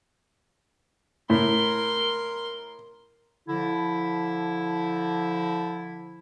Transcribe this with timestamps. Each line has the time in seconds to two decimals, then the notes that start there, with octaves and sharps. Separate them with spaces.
1.30 A2 A#4 C6
3.47 D3 F3 E4